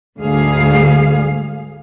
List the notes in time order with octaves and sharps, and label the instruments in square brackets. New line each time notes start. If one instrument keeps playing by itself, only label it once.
[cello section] D2 G#2 D3 G3 G#4 F5